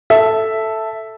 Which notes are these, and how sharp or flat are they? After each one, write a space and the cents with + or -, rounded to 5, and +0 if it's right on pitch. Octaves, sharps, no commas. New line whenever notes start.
A4 +0 E5 +0